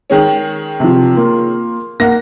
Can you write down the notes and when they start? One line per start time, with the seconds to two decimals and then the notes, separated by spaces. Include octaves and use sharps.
0.10 D#3 G#3 C#4
0.80 C3 F3
1.16 A#3 F4
2.00 A#3 F#5 A#6